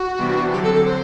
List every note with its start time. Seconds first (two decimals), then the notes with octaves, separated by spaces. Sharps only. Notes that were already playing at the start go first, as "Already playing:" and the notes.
Already playing: F#4
0.18 C3 E3 G3 B3 D4
0.51 D3 F#3 C4 G4
0.63 A4
0.74 A4
0.85 C5